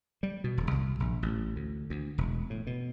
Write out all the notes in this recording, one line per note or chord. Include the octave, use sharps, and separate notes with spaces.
G3
B2
D#1
C2
A#1
A1
D2
D2
E1
A2
B2